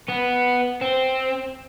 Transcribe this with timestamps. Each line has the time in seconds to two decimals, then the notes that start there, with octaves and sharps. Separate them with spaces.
0.08 B3
0.82 C4